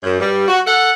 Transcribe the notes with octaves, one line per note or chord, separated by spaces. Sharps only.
F#2
G2 G3
F#4
A4 F#5